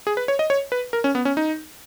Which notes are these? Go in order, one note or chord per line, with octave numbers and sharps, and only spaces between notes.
G#4
B4
C#5
D#5
C#5
B4
A#4
C#4
B3
C#4
D#4